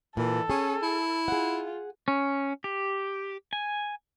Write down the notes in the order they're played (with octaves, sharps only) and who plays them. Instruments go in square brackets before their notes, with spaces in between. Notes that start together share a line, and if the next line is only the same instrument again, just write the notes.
[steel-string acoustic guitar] A#2 [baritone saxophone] E3 [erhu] A4
[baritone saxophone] C#4 [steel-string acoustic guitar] G#4
[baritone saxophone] E4
[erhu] F4 [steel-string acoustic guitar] G#4 F#5
[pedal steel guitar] C#4
G4
G#5